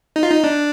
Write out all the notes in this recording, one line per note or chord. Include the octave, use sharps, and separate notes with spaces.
D#4
F4
D#4
D4